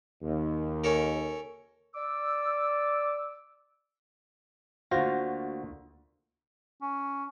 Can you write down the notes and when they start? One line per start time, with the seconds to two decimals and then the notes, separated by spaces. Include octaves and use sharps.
0.23 D#2
0.84 C#4 A4 A#4
1.95 D5 D6 E6
4.91 D2 A#3 F4 F#4 C5 A#6
6.82 C#4